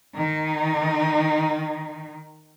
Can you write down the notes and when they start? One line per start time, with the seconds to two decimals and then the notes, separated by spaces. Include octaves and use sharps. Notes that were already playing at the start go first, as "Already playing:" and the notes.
0.15 D#3 D#4